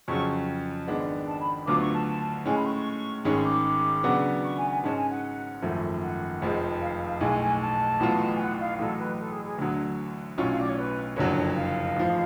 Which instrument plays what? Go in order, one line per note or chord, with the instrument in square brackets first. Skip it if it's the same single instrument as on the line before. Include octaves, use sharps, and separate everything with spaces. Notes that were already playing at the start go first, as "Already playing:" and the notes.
[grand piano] F2 C#3 F#3 C#4 F4 [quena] C#6
[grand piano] G#1 G#2 G#3 B3 D4
[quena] A5
B5
[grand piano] D2 D3 F#3 B3 F4 [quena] D6
[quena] C#6
A5
[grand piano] A2 G#3 C#4 [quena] G#5
[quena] B5
C#6
C#6
[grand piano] G#1 G#2 G#3 C#4 [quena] C#6
[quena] D6
[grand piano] C#3 F#3 B3 D4 F#4
[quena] C#6
G#5
G#5
[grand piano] G#2 G#3 C#4 [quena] A5
[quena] G#5
F#5
[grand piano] G#1 F#2 F3 A3
[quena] F#5
[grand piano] F1 F2 F3 G#3
[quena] F5
F5
[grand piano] B1 A2 G#3 [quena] G#5
[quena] G#5
A5
[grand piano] A1 A2 F#3 B3 F4
[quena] G#5
F#5
F5
[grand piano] A1 A2 F#3 [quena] A4
[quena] B4
A4
G#4
G#4
[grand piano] D2 D3 F#3
B1 A2 F#3 C#4 F4
[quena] F5
D5
C#5
B4
[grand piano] F#1 F2 D3 F#3 [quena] C#5
[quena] C#5
F5
[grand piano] A1 G#2 F3